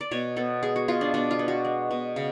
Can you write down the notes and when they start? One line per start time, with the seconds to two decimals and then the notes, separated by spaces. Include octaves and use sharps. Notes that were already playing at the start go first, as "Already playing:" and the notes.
0.01 D5
0.11 B2 C#5
0.36 B3 A4
0.62 G#3 G#4
0.76 F#4
0.88 B2 F4
1.01 D4
1.14 B2 D4
1.31 F4
1.39 B3
1.48 F#4
1.65 G#3
1.91 B2
2.16 C#3